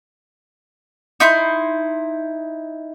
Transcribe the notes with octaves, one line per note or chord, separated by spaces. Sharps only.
D#4 E4 C6 G6